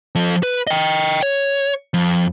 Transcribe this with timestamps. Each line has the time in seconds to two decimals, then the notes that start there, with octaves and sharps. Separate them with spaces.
0.15 F3 A4
0.43 B4
0.67 D#5 G5
1.22 C#5
1.94 F2